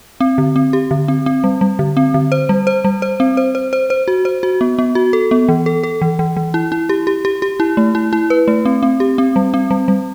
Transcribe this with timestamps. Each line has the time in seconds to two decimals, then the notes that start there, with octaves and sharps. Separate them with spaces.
0.21 C4
0.38 D3
0.56 C4
0.73 G4
0.91 D3
1.08 C4
1.26 C4
1.44 G3
1.61 G3
1.79 D3
1.97 C4
2.14 D3
2.32 C5
2.49 G3
2.67 C5
2.85 G3
3.02 C5
3.20 C4
3.37 C5
3.55 C5
3.73 C5
3.90 C5
4.08 F#4
4.25 C5
4.43 F#4
4.61 B3
4.79 B3
4.95 F#4
5.13 A4
5.31 B3
5.49 E3
5.66 A4
5.84 A4
6.02 E3
6.19 E3
6.37 E3
6.54 E4
6.72 E4
6.89 G4
7.07 G4
7.25 G4
7.42 G4
7.60 E4
7.77 A3
7.95 E4
8.13 E4
8.30 B4
8.48 A3
8.65 C4
8.83 C4
9.00 G4
9.18 C4
9.36 G3
9.54 C4
9.71 G3
9.88 G3